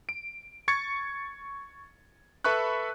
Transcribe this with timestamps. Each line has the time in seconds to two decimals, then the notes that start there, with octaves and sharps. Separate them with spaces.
0.09 D7
0.68 C#6 G#6 A6 C#7
2.44 A4 B4 E5 B5 C#6 F#6